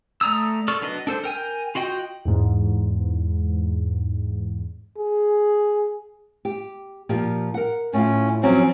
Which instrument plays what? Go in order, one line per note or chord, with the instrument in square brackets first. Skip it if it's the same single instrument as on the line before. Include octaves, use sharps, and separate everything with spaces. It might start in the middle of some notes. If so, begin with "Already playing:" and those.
[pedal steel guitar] A3 D5 A#5 D#6 E6
A4 D5 C#6 F6
F#3 B3 D4 B4 D#5
D4 A4 C5
A#4 G5 G#5
F4 F#4 D#5 G5
[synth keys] E2 G#2
[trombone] G#4
[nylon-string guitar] G4
A#2 F3 G4
A#4 F#5
[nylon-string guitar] A2 F4 [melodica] C#4
[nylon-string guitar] F3 C4 [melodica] F#3 C#4